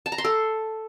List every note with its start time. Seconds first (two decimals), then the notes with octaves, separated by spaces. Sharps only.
0.06 A5
0.12 A#5
0.18 C6
0.24 A4